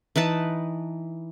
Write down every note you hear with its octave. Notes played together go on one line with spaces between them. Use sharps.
E3 D#4 B4 A5